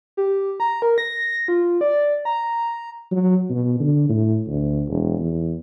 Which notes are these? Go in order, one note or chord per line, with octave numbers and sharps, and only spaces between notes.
G4
A#5
A#4
A#6
F4
D5
A#5
F#3
B2
D3
A2
D2
E1
E2